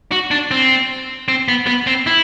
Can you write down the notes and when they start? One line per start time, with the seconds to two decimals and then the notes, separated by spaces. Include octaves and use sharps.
0.12 F#4
0.31 D4
0.51 C4
1.28 C4
1.48 B3
1.67 B3
1.87 C4
2.07 E4